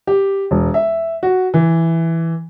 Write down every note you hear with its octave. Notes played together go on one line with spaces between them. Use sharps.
G4
E1
E5
F#4
E3